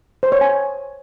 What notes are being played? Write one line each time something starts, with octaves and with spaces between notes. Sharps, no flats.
C5
C#5
G#5